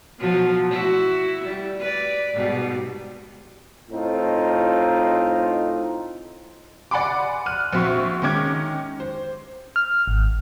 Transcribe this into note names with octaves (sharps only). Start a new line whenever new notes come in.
B2 F3 F#3
E4 F#4
G3
B4 D5
G#2 B2 G3
A2 C4 D#4 F4
D5 F#5 G#5 B5 C6 D6
F6 F#6 D#7
A#1 C4 F#4 E5 C6 C#6
D#3 G#3 C#4 D6 G#6
C5
F6
G#1